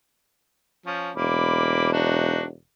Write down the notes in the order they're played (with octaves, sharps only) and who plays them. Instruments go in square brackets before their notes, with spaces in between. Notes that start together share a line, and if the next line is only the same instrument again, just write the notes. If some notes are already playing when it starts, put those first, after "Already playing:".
[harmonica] F3 C#4
[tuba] E1 [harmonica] A#3 B5 D6
[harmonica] D4 D#4 F#4